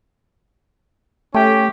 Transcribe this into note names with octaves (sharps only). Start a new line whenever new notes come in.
A3 C#4 G4 G5